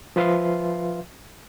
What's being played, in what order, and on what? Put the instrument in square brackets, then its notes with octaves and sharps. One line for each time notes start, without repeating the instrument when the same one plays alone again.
[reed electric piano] F3 F4 B4 E5 F5 C6